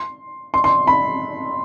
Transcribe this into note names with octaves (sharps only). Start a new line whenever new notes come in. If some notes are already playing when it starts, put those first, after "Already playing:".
Already playing: C6
C6
C6
B5